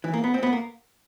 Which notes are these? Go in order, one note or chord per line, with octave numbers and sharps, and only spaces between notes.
E3
A#3
B3
C4
B3
A#3